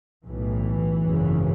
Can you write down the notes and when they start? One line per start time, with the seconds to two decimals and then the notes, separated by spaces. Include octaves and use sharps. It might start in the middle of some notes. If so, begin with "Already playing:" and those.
0.25 B1 A2 E3
1.03 G#1 F#2 C#3